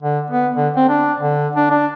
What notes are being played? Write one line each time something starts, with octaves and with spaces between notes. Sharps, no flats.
D3
B3
D3
C4
D4
D3
D4
D4